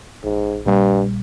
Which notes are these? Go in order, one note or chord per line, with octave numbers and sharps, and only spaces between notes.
A#1 G#2
G2 A#2 G3